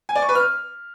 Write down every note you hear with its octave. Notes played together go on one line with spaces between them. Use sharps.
G#5
D5
C#6
B4
F6